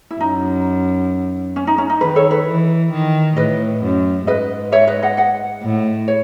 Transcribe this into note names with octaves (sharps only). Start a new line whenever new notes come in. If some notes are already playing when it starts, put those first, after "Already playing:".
E4
F#2 D#4
C#4
D#4
C#4
D#4
D#3 B4
A4 C#5
B4
E3
D#3
A2 B4 D#5
F#2
G#2 B4 D#5
C#5 E5
B4 D#5
D#5 F#5
D#5 F#5
A2
C#5